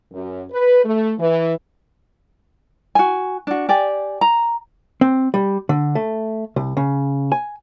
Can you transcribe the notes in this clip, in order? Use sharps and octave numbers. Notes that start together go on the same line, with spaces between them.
F#2
B4
A3
E3
F#4 G#5
D4 F#4
G4 D5 G#5
A#5
C4
G3
D3
A3
C2
C#3
G#5